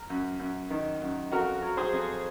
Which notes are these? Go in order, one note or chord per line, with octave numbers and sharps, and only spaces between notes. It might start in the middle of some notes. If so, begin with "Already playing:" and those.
Already playing: A#4
F#2
F#2
D#3
F#2
F2 F#4 A#4
F#3
G#4 C5
F2